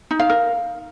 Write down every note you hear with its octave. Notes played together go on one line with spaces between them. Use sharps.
D#4
F5
A#4